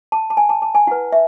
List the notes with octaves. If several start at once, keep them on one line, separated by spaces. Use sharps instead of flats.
A5
A5
G#5
A5
A5
G#5
E4 B4 F#5
E5